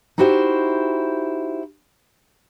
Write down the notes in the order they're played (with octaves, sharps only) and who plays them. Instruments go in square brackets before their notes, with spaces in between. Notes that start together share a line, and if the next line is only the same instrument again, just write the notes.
[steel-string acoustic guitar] D#4 E4 F#4 G4 C5